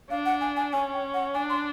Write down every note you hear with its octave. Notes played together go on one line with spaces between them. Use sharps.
D4 F5
F#5
G#5
G#5
C#4 G#5
G5
F#5
D4 G#5
C6